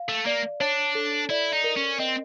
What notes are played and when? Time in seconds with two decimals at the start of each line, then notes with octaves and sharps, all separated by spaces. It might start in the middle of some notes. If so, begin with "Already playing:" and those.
Already playing: F5
0.09 A3
0.26 A#3 D5
0.60 D4 C#5
0.95 A4
1.29 E4 D5
1.53 D#4
1.64 A#4
1.77 C#4
2.00 C4 D#5